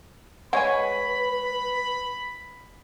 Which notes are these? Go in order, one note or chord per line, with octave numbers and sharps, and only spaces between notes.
G#3 B4 C#5 F#5 G#5 B5